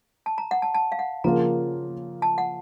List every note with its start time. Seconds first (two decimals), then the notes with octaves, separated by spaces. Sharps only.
0.26 A5
0.38 A#5
0.51 F#5
0.62 A5
0.74 A5
0.92 F5
0.99 F#5
1.24 C#3 F3 A#3 F4 A#4 A#5
2.22 A5
2.38 F#5